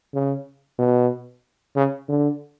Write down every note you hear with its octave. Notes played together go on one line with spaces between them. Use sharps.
C#3
B2
C#3
D3